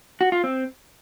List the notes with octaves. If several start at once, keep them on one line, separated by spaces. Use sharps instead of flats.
F#4
F4
C4